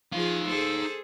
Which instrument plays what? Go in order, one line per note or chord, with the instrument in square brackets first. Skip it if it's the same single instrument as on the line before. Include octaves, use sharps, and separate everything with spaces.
[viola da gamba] F3 F4 G#4 [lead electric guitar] D#4 F5
[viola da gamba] G#4 A4 C5